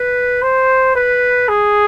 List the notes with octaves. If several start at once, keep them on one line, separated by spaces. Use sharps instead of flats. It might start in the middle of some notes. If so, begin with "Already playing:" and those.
Already playing: B4
C5
B4
G#4